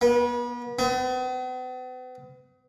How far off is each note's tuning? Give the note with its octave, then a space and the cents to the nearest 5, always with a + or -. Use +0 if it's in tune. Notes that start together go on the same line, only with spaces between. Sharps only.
B3 -35
B3 +45